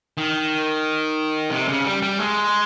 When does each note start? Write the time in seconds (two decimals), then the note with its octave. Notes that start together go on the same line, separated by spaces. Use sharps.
0.17 D#3
1.51 C3
1.68 C#3
1.85 G3
2.02 G3
2.19 G#3